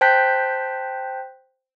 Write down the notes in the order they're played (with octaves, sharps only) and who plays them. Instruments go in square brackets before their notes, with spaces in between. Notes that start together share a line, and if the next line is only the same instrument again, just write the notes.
[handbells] C5 G5 A5 F#6 G6 B6